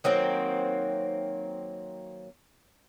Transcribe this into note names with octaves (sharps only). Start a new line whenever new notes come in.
D#3 F#3 A#3 C4